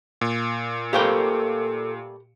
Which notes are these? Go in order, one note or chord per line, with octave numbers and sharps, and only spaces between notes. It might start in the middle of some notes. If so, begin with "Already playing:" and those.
A#2
G3 A3 A#3 G4 A4 A#4 C5